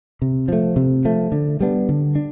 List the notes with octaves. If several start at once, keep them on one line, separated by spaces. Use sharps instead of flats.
C3
F3 A3
C3
F3 A3
D3
G3 B3 D4
D3
D4